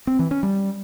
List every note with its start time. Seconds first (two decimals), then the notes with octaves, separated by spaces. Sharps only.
0.07 C4
0.19 E3
0.31 C#4
0.43 G3